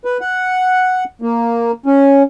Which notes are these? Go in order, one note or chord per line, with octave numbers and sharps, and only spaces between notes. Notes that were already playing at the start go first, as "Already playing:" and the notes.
B4
F#5
A#3
C#4